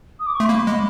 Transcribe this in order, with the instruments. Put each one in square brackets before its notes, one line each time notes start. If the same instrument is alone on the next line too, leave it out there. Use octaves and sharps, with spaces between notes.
[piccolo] D#6
D6
C#6
[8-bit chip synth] A3 [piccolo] C6
[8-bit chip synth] A#3 [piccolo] B5
[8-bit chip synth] G#3